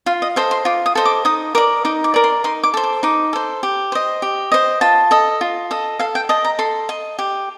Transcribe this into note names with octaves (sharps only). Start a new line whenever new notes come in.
F4 F5
D#5
A4 C5 D#5 F5
C6
F4 D6
D#6
A4 C5 D#5
D6
D#4 D#6
A#4 D5 D6
D#4 D6
D6
A#4 D5
C6
D#4 C6
D6
A4 C5
D6
D#4 D6
A4 C5
G4
C5 D#5
G4
C5 D#5
F4 A5
A4 D#5
F4
A4 D#5
A4 F5
G5
D#5 A5
A#5
A4 C6
D#5
G4